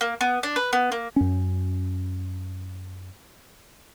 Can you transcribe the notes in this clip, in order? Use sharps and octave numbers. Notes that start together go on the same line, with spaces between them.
A#3
B3
D4
B4
B3
A#3
F#2 C#4